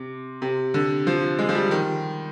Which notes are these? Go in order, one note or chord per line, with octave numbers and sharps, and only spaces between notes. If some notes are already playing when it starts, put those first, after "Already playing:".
Already playing: C3
C3
D3
F3
G#3
F3
G3
D#3